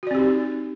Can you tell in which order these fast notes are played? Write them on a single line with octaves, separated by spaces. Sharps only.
F#4 D5 C4 G4 D#4